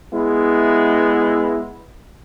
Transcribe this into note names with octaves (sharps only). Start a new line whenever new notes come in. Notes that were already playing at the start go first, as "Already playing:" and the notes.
G#3 B3 E4